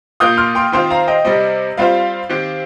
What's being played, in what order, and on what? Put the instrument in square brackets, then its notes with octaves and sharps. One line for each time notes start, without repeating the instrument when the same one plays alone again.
[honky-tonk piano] A#2 A#3 F4 [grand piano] D#6 G6
[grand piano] C6 F6
G5 C6
[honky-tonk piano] D#3 C4 F4 C5 [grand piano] G5 C6
[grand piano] F5 A#5
D#5 G5
[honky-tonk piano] C3 G3 C4 [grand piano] D#5
[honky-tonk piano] G3 C4 F4 C5 [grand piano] F5
[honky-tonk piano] D#3 C4 G4